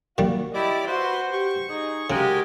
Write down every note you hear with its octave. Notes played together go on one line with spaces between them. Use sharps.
A#2 D#3 G3 F#4
E4 G4 D5 D#5 D6
F#4 B4 C5 C6
G4 C#6
D#4 G#4
C#3 G#3 F#4 G4 A#4 G5 G#5